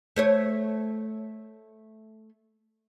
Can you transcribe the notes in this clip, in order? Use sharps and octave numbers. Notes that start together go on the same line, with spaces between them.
A3 C5 C#5